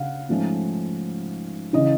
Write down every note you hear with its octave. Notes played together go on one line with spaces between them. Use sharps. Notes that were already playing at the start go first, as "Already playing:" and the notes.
Already playing: C#3 F5 F#5
G#2 F3 A3 C#4
C#3 E3 D#5